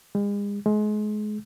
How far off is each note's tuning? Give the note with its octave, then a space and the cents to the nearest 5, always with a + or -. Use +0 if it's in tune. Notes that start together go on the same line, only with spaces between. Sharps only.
G#3 -40
G#3 +30